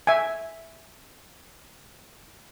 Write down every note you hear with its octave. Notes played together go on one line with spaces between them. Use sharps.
E5 G#5